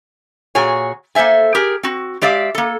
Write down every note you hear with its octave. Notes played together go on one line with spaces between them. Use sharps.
A#2 F#4 G#4 C#5 G#5
A#3 A4 C5 E5 G#5
G4 G#4 A#4
C4 F#4
G#3 G4 D5 E5 F5
A#3 A4